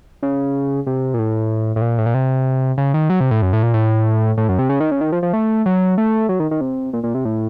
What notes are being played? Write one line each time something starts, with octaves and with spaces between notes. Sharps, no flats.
C#3
C3
A#2
A2
A2
A#2
A2
A#2
C3
C#3
D#3
F#3
C3
A2
F#2
A2
A#2
A2
A2
F#2
C3
C#3
D#3
C#3
D#3
F3
F3
A3
F#3
A3
F#3
D#3
D#3
C3
A#2
A#2
C3
A2